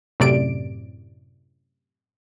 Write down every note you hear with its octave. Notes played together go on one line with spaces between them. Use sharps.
F#2 A2 C3 D5 D7